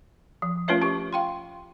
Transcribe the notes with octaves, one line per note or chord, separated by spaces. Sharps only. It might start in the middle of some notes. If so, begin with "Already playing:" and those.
F3
A3 C#4 F4 B4 C#5 E5
C#4 G4 C#6
F5 G5 C6